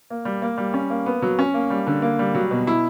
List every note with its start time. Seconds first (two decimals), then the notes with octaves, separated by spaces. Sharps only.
0.10 A#3
0.25 G3
0.42 A#3
0.58 G3
0.74 C#4
0.90 A#3
1.06 B3
1.22 F#3
1.39 C#4
1.54 A#3
1.70 G3
1.87 D3
2.02 A#3
2.19 G3
2.35 F#3
2.51 B2
2.67 E4